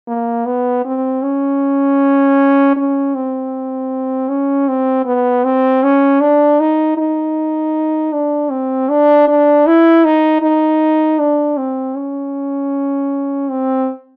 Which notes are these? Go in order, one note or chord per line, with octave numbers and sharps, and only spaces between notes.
A#3
B3
C4
C#4
C#4
C4
C#4
C4
B3
C4
C#4
D4
D#4
D#4
D4
C4
D4
D4
E4
D#4
D#4
D4
C4
C#4
C4